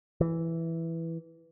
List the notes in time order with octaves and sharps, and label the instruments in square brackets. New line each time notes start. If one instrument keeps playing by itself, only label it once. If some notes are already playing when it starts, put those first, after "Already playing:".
[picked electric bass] E3